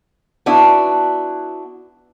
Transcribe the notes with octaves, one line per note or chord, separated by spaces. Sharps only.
B3 D4 E4 F#4